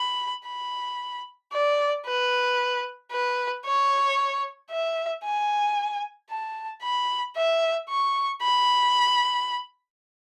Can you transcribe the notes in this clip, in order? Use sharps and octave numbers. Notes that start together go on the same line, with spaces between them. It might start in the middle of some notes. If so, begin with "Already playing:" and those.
Already playing: B5
B5
D5
B4
B4
C#5
E5
G#5
A5
B5
E5
C#6
B5